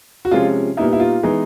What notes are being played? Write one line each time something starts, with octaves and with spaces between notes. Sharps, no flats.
F#4
C3 F3 G#3 C#4 F4
A#2 G3 B3 D#4 E4
E4
F4
E3 G#3 B3 D#4